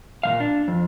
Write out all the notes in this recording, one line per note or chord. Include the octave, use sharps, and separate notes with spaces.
A#2 D#3 F5
D4
F2